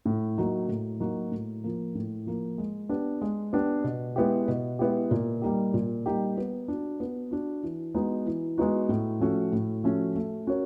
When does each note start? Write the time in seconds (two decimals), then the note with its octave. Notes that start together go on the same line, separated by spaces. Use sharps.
0.05 A2
0.38 F#3 A#3 D#4 F#4
0.68 A2
1.00 F#3 A#3 D#4 F#4
1.32 A2
1.64 F3 A#3
1.95 A2
2.27 F3 A#3
2.58 G#3
2.89 B3 D4 G4
3.22 G#3
3.53 B3 D4 G4
3.84 B2
4.16 G#3 B3 E4 G4
4.48 B2
4.79 G#3 B3 E4 G4
5.11 A#2
5.42 G3 A#3 D#4 G4
5.74 A#2
6.06 G3 A#3 D#4 G4
6.37 B3
6.68 D4 F#4
7.00 B3
7.31 D4 F#4
7.63 E3
7.94 G#3 B3 D#4 F#4
8.26 E3
8.58 G#3 B3 D#4 F#4
8.89 A2
9.20 F3 A3 C#4 F#4
9.52 A2
9.84 F3 A3 C#4 F#4
10.16 A3
10.47 C#4 F#4 A#4 C#5